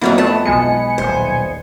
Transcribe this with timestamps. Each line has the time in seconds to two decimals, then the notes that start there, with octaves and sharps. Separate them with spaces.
0.01 F2 F#3 A#3 B3 E4
0.18 F2 A3 A5
0.45 B1 G#3 G#5 C#7
0.98 D#1 C5